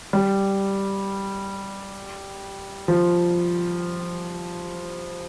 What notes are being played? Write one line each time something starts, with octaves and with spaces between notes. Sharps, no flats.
G3
F3